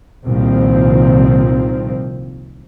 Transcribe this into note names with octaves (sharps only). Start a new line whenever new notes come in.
C2 A#2 D#3 F3 C4